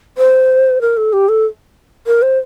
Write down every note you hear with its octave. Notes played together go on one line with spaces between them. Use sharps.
C5
A#4
A4
G4
A4
A#4
C5